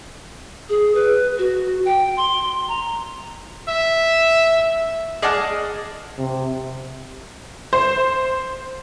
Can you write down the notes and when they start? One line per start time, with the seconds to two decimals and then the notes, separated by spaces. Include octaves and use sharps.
0.69 G#4
0.95 B4
1.39 F#4
1.85 G5
2.17 C6
2.68 A#5
3.68 E5
5.22 G#4 D5 D#5 F#5 A5 F6
6.19 C3
7.73 C5